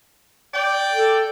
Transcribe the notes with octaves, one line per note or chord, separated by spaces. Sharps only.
D5 G5
A4